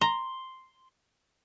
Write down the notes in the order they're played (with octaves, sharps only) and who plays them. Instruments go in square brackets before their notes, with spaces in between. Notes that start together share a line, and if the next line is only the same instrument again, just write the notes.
[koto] A#5 [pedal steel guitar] C6